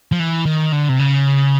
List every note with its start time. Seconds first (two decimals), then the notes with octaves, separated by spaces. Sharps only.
0.12 F3
0.20 E3
0.45 D#3
0.72 D3
0.89 C3
0.99 C#3